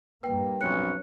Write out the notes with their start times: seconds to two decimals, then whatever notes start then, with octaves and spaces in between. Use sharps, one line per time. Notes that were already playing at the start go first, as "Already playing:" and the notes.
0.23 G2 A#3 B4 G5
0.61 B1 F2 C#4 F#6 C#7